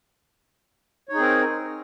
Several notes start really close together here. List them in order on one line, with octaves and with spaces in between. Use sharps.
C#5 D#4 G#4 C4 A#4